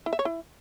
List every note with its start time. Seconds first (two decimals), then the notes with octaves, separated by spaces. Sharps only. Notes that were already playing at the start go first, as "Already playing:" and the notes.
0.06 E4
0.13 E5
0.19 C#5
0.25 E4